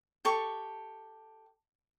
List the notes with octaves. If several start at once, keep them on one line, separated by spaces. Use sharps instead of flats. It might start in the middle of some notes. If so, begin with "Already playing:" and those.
G4 A4 C#6